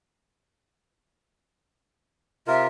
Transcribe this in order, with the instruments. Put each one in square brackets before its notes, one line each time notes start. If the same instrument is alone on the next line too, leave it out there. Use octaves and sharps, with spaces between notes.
[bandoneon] C3 F4 A#4 [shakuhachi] E5